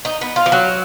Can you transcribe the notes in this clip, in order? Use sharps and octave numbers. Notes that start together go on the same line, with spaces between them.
D#4
B3
F4
F3
F#3